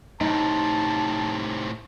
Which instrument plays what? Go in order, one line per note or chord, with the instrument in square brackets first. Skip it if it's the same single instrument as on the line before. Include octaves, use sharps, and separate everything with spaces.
[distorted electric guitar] A2 C3 [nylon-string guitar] D#4 [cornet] A5